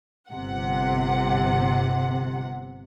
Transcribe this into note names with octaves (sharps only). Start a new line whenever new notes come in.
G1 C3 F#5